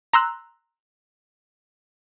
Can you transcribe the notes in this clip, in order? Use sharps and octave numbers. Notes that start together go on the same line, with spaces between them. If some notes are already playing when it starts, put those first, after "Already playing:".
A#5 C6 E6 F#6